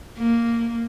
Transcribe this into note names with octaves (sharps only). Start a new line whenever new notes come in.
A#3